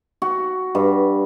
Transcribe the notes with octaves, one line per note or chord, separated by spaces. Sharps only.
F#4
G2